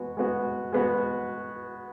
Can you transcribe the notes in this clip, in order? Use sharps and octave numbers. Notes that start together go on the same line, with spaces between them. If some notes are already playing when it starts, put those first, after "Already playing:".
Already playing: G#3 B3 F#4
G#3 B3 F#4
G#3 B3 F#4